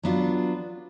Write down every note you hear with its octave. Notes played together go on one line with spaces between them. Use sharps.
F#3 B3 D4 F4